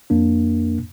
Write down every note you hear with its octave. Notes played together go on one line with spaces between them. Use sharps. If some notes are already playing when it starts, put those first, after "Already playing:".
F2 A#3 D4